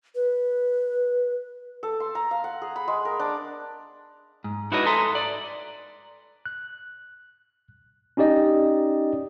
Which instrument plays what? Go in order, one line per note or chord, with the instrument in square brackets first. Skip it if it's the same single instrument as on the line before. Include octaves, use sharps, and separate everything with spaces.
[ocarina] B4
[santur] A4
C6
A#5
F5
F#5
G#4
B5
G#3
A#4
D4
[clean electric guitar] G#2
D#4 E4 F#4 B4 C#5 D#5
A4 D#5 E5 G#5 A#5 C6
D5
[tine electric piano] F#6
C#4 D#4 G4 D5 D#5